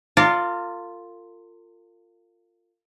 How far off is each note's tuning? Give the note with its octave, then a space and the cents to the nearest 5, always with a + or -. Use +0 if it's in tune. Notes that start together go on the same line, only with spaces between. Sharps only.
F4 +0 A#4 -45 D5 +0